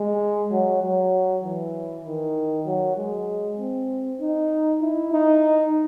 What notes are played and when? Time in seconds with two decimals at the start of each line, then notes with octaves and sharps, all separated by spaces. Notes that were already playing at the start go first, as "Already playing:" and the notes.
Already playing: G#3
0.51 F#3
0.82 F#3
1.43 E3
2.05 D#3
2.66 F#3
2.97 G#3
3.58 C4
4.20 D#4
4.81 E4
5.12 D#4